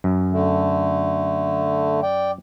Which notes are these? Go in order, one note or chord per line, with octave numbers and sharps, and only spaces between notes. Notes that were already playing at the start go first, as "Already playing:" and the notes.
F#2
D3 A3
D5 G5